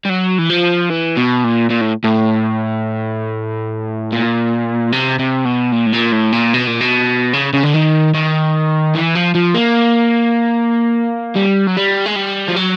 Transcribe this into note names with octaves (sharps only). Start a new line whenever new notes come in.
G3
F#3
E3
F3
E3
B2
A#2
A#2
A2
A2
A#2
C3
C3
B2
A#2
A2
A#2
A2
A#2
B2
A#2
B2
C#3
C#3
D3
D#3
D#3
E3
F3
F3
A#3
G3
F#3
G3
G#3
G3
F3
F#3